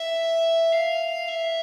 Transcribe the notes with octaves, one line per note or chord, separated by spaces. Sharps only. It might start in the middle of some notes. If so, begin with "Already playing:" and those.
Already playing: E5
F5
E5